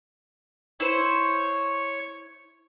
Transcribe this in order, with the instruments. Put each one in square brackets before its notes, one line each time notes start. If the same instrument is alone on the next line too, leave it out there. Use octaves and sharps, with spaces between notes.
[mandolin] E4 C5 [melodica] C#5 C#6